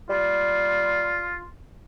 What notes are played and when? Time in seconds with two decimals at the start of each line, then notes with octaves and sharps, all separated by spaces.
0.10 G3 F4